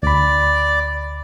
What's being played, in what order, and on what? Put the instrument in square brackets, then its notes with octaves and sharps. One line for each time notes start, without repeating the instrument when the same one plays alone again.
[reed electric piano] D2 B5 [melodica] D5